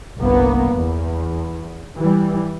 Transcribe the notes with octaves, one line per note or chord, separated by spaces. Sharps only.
G1 C2 A#3 B3
E2
E3 G3